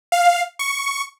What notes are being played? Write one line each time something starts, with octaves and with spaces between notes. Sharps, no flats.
F5
C#6